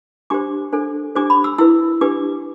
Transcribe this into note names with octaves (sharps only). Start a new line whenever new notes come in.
D4 G4 C5 D6
D4 A4 C5
D4 G4 C5 D6
B5
E6
E4 B4 E6
D4 G4 B4 D6